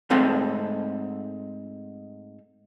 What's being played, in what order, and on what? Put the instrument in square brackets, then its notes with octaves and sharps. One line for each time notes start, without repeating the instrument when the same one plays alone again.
[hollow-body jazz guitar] G#2 A3 C4 A4 F5 A5